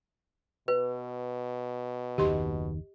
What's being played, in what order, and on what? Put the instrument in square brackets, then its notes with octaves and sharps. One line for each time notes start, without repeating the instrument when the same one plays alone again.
[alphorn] B2 [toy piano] B4
[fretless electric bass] F#1 D#2 D#3 [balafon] G4 D#5 C6